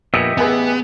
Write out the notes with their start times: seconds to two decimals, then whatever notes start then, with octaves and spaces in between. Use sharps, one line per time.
0.14 A#1 A#2 B3 G4 D#5 E5 A#6 C#7
0.37 A1 B3 G#4 B4 G#5